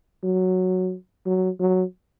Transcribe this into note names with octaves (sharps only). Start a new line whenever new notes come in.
F#3
F#3
F#3